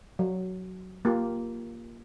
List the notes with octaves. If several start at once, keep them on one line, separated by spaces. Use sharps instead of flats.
F#3
A#3 F4 G4